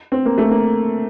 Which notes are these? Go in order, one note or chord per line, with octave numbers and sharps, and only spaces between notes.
C4
A#3
A3
A#3